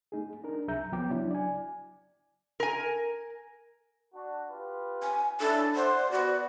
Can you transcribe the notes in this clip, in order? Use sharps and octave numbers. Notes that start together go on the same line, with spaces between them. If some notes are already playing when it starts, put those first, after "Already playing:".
A3 D#4 G#4
D4 D#4 A#4
C2 F#3 G#4 E5 A#5 G6
D2 F3 F#3 B3 G5 D6
C#3 F#3 D4 E4
D5 G#5
A#4 G#5
D4 F#4
F4 G4 B4
G#5
C#4 D4 E4 A4
C5 D5 E5 F#5 C6
B3 F#4